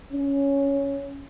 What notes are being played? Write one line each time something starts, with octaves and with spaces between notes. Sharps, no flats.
C#4